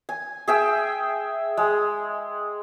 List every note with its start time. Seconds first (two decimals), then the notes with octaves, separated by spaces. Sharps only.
0.09 G#5
0.48 G#4 E5 G5
1.57 G#3